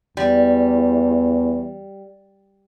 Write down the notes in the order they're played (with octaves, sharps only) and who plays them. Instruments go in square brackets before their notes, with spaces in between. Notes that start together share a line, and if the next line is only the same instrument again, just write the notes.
[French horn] E2 [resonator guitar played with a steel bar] G3